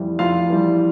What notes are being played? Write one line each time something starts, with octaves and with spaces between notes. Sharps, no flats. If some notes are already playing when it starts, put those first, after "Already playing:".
Already playing: F2 E3 G3
F2 F4 F5
E3 G3